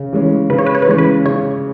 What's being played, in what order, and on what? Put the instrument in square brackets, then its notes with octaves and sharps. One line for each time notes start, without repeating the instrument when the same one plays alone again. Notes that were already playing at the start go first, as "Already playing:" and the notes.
Already playing: [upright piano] C#3
E3 G#3 C#4
[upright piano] C#3 [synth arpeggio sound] B4
[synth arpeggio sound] C#5
B4
C#5
B4
[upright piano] E3 G#3 C#4 [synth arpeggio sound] C#5
[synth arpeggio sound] B4
[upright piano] C#3 [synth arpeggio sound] C#5